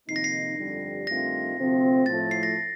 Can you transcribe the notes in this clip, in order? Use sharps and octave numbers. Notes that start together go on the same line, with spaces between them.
F2 C3 D#3 A#3 D#4 C7
A#6
C7
G1 F2 D3 G3
G2 D#3 A3 C4 F4 A#6
D2 C3 F3 A3 C4
A2 F3 A3 A6
C7
A#6